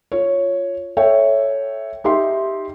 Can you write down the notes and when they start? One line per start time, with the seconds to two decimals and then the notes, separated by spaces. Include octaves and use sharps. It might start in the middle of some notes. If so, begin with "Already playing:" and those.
0.12 F4 C#5
0.97 A4 C#5 E5 G5
2.04 D#4 G4 E5 C6